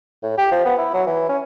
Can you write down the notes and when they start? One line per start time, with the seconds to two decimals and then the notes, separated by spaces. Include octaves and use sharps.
0.23 A2
0.38 G4
0.51 F3
0.66 B3
0.78 E4
0.94 F#3
1.07 E3
1.29 C#4